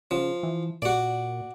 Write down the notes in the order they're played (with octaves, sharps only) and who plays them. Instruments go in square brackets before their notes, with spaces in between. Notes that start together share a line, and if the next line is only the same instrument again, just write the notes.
[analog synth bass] C#3 [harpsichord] F3
[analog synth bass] E3
[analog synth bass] A#2 [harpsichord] F#4 D5